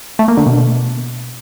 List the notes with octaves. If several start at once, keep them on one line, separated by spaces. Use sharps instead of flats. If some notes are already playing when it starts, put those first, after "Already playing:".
A3
A#3
D3
B2